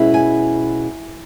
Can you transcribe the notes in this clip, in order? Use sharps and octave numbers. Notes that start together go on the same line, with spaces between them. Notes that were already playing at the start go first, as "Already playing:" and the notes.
Already playing: B2 G#3 C#4 E4
G#5